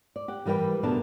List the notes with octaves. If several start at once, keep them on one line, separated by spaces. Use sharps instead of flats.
D5
G4 F#5
E3 G3 A#4 B4 G5
D2 B2 A3 D4 A#4 A5